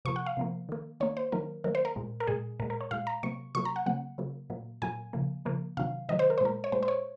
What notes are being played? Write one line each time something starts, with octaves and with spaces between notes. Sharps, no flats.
C3 F3 A#3 C#6
F#5
F5
C3 F3 A#3
D#3 A#3
D#3 A#3 C#5
C5
D#3 F#3 A#3 A#4
D#3 F#3 A#3 A#4
C5
A#4
A#2 G#3
A#4
A#2 G#3 G#4
A#2 G#3 A#4
A#4
C#5
A#2 G#3 F5
A#5
C3 F#3 A#3 C#6
C3 F#3 A#3 C#6
A#5
F#5
C#3 F#3 A#3 F#5
C#3 F#3 A#3
A#2 F#3 A#3
A#2 F#3 A#3 G#5
C#3 F3 A#3
C#3 F3 A#3
C3 D#3 F#3 F5
C3 D#3 F#3 D#5
C5
A#4
C5
A#2 G#3 A#4
C#5
A#2 G#3 C5
C5
C#5